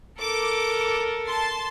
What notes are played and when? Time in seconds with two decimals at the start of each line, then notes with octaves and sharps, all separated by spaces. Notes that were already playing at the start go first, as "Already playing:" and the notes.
0.20 A4 A#4 D6
1.26 A5 C6 A6